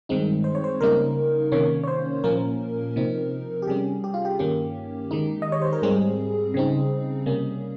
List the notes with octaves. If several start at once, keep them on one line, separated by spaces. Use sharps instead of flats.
G2 D#3 G#3 C4 D#4
C5
C#5
C5
C#3 G3 A#3 D#4 A#4
C3 D#3 A#3 C#4 C#5
C#5
C5
A#2 F3 A#3 C#4 A#4
C3 F3 C4 D#4
G4
C3 G3 C#4 G#4
G4
F4
G4
G2 D#3 A#3 C#4 G4
D#3 G#3 D#4
D#5
C#5
C5
A#4
G#2 G3 C4 G#4
C#3 G3 C4 D#4
C3 G3 A#3 C#4